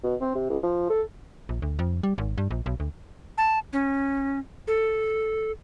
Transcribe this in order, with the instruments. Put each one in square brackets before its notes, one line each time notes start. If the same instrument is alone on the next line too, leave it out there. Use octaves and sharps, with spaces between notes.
[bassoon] B2
C4
C3
C#2
F3
A4
[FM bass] A#1
D2
F2
G3
G#1
G2
A#1
B1
D2
[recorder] A5
C#4
A4